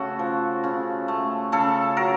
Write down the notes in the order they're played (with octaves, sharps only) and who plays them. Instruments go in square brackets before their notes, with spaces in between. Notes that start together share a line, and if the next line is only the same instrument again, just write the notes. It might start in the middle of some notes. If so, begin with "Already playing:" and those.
Already playing: [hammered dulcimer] C#3 A3 F#4 A4
F3
C#3
A3
C#3 A4
F#3 A#4